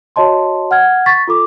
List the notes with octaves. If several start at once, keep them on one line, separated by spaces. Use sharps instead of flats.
F#4 C#5 D#5 A5 C6
F#5 F6 G#6
C#6 A6 B6
F4 A4 D6